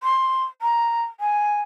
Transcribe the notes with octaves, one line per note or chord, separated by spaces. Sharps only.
C6
A#5
G#5